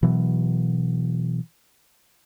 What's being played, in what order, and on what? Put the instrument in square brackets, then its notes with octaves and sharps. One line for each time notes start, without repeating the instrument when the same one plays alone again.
[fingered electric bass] B2 E3 F#3